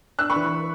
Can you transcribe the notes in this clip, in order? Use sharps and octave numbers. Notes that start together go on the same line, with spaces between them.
D4 E6 F#6
B5 C#6
E3